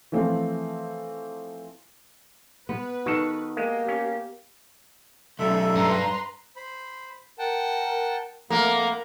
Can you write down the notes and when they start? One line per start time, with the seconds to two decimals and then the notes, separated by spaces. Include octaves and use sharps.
0.12 E3 F3 A3 C4
2.69 B3 B4
3.06 D#3 F#4 A4
3.57 G#3 A#3 G4
3.88 C#4
5.39 B1 F#2 A4 E5
5.76 G2 B4 A#5 C6
6.56 C5 B5
7.39 A#4 F#5 G5 A5
8.50 F2 A2 A3 A#3 F#5 B5